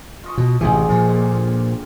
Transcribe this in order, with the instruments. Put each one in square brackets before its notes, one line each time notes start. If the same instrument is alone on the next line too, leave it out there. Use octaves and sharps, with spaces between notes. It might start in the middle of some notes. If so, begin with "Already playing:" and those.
[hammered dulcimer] F4 D#5 C#6
[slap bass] B2
[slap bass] A1 C3 E3 [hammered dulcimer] G#3 G4 G#4
[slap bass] A#2 F3 [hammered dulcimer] F4
[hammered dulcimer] D3 A#3